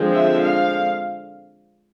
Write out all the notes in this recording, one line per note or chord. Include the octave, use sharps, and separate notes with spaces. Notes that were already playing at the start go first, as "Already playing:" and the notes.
Already playing: D3 F3 G#3 C4
E5
F5